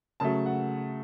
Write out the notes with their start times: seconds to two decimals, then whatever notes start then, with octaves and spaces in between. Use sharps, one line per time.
0.20 C#3 F#3 A3 A5
0.46 F#5